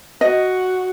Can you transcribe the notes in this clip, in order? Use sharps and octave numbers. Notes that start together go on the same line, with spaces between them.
F#4 D#5